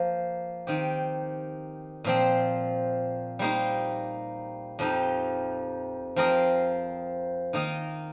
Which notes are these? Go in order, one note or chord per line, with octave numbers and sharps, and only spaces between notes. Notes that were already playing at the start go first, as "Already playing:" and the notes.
Already playing: F3 A#3 F4
D#3 C4 G4
A#2 F3 C4
G3 A#3 D#4 C5
F2 F3 D#4 G4
F3 C4 F4 A#4 D#5
D#3 A#3 D#4 A#4 D#5